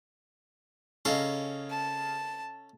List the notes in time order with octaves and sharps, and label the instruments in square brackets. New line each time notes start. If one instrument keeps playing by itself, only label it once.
[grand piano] C#3 [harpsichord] C#4 A4 A#5 [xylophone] D#5 F5 C7
[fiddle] A5